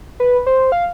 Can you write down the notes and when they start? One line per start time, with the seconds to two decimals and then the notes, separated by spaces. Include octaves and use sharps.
0.20 B4
0.47 C5
0.72 F5